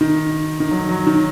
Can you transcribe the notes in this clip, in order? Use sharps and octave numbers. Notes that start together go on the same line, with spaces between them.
D#3
D#3
F#3
F#3
D#3